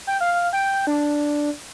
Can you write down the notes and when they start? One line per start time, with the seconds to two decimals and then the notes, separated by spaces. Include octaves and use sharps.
0.07 G5
0.21 F5
0.53 G5
0.87 D4